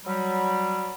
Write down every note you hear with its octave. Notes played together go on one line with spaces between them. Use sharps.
F#3 G3